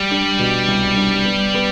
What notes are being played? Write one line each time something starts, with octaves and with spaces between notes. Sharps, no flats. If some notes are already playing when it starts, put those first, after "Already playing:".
Already playing: G3
D4
B2
C2
D4
B3
B3